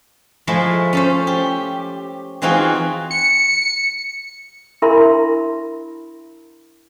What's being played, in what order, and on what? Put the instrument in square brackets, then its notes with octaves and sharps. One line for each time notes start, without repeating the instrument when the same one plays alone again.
[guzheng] F3 G#3 A3 E4
C#4 A4 C5
G4
E3 C4 D#4 F4 F#4 G#4
[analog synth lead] C#7
[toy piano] D4 E4 A#4 E5 B5 C6